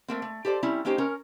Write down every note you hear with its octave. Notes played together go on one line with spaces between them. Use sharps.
A3 A#3 C4
A3
G4 A4 C5 D5
G3 C4 C#4 E4
A#3 C#4 D#4 G4 C5
C#4 A#4